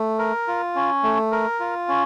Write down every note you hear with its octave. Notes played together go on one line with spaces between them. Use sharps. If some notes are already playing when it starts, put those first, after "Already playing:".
Already playing: A3
A#4
F4
C#4
A3
A#4
F4
C#4